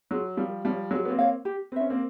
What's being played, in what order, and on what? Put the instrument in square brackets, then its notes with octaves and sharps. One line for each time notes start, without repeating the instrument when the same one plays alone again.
[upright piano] F#3 [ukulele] F4 G#4
[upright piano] F3 G3 [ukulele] A#4
[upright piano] F3 G3 [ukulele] C#5 F5
[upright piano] F#3 G#3 [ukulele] A#4
[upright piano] B3
A#3 C4
[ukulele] C#5 F5
G4
[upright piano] C4 [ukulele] B4
[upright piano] C#4 [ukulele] E5
[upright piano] A#3 C4